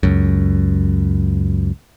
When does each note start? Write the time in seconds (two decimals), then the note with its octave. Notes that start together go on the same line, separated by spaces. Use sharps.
0.03 C#2 F#2